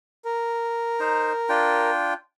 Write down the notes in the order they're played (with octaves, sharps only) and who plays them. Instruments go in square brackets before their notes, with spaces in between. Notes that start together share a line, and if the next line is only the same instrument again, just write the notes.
[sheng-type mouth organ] A#4
[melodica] D#4 C5
D4 F4 G5